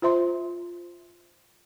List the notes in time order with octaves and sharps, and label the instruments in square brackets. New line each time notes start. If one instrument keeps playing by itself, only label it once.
[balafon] F4 C5 E5 C6